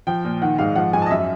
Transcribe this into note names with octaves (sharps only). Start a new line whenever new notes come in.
F3 G5
A#2
D#3 F#5
G#2 F5
F3 F#5
G#2 G#5
A5
D#5
F#2 E5